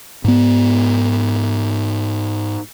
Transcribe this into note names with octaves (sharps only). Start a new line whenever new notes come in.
G#2 B3